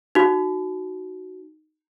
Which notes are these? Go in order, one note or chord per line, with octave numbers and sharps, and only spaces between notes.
D#4 F#4